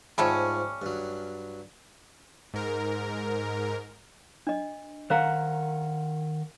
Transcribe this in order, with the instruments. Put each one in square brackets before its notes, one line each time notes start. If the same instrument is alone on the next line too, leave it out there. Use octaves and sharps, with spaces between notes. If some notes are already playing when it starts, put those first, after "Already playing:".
[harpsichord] G#2 F3 [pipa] G3 A3 C#4
[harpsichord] G2 F#3
[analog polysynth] G#2 A#4
[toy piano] D4 D#5
[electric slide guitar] D#3 A#4 F#5 [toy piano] C5 F5 A#5